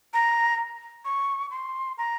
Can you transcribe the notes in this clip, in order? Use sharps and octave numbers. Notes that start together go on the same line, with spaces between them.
A#5
C#6
C6
A#5